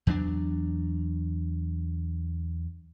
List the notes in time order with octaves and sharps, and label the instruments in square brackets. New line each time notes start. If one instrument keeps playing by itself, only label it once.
[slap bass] E2 F#3 A3 D4